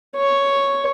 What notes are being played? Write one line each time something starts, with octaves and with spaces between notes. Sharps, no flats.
C#5